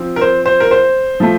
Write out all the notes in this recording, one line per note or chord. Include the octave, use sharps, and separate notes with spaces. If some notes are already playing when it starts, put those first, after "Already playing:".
Already playing: F3 C4
A#4
C5
C5
A#4
C5
F3 A3